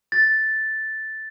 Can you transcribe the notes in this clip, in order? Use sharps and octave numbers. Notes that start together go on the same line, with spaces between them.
A6